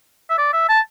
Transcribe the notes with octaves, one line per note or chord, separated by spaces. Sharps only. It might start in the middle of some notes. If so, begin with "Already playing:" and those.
E5
D5
E5
A5